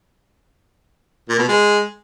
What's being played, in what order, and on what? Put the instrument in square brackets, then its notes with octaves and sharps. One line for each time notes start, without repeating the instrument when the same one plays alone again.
[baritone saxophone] A#2
B2
G#3